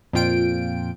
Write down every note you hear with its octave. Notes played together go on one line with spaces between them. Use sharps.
F2 A#2 F4 G5 D7